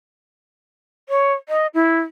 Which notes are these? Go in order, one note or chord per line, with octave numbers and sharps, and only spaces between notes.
C#5
D#5
E4